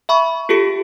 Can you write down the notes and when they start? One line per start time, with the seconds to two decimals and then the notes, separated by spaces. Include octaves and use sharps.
0.09 E5 B5 C#6
0.49 F4 G4 A4 C#7 D7